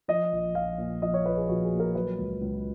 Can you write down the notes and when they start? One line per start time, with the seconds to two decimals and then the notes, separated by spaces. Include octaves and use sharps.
0.08 F3 D#5
0.33 A#1
0.55 A#1 F5
0.78 A#2
1.02 F3 D#5
1.14 C#5
1.26 A#1 B4
1.37 G#4
1.49 A#1 F#4
1.65 G#4
1.72 A#2
1.80 A#4
1.95 F#3 B4
2.19 C#2
2.42 C#2